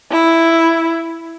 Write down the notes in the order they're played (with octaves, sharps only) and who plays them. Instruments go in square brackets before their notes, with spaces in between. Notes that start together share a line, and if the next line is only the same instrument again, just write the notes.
[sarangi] E4